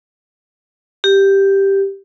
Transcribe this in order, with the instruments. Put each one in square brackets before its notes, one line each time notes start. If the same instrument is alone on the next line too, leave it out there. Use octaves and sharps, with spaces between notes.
[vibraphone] G4